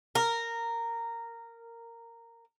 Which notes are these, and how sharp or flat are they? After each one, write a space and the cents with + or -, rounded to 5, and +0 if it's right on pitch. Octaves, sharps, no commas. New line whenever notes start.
A#4 -10